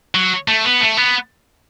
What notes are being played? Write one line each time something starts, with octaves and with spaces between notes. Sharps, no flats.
F#3
A3
B3
A3
B3